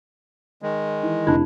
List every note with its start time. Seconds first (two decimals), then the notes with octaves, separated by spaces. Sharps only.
0.62 D#3 G#3
1.03 E3
1.27 F1 D4 E4